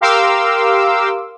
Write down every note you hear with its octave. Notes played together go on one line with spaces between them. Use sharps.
G4 A#4 F5 C6 D6 E6